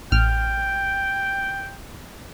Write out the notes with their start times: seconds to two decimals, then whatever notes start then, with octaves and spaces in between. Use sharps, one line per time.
0.12 A1 G5 F6